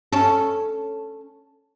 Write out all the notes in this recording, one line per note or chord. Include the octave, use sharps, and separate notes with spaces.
C#4 A4